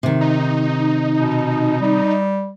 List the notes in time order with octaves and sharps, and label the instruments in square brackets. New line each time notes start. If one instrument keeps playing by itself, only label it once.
[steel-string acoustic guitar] C3 D#3
[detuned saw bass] D#4
[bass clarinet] B2
G3